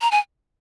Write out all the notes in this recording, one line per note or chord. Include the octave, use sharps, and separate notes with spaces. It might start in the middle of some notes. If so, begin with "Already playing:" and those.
A#5
G#5